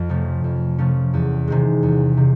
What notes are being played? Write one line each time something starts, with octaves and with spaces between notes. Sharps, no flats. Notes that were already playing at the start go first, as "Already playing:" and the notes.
Already playing: F2
C3 F3 A3 C#4
F2
C3 F3 A3 C#4
E2
C3 D#3 G#3
E2
C3 D#3